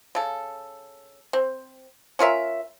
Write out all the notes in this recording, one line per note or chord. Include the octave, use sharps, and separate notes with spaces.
C#3 A4
C4
C#4 F4 A#4 E5